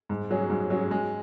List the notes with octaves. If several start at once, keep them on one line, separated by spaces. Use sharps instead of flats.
G#2
F#3 C#4 G#4
G#2
F#3 C#4 G#4
G#3